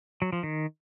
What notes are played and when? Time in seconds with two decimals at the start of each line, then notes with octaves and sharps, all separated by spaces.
0.22 F#3
0.33 F3
0.43 D#3